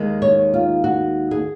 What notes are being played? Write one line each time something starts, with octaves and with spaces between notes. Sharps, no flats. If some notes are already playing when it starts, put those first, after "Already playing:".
Already playing: D#2 D#3 G#3
C#5
F4
F#4
G#4